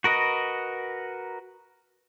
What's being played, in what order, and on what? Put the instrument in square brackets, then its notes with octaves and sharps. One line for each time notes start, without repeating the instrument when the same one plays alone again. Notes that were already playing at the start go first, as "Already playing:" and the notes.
[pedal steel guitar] F#4 A#4 B4 D#5